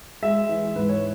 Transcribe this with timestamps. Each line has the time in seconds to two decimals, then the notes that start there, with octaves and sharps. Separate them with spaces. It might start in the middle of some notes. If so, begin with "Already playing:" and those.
0.22 G#3 E5
0.49 E3
0.76 G#2 B4
0.89 C#5